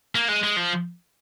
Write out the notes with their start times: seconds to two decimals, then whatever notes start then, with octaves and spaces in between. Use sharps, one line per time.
0.15 A#3
0.28 G#3
0.44 G#3
0.56 F3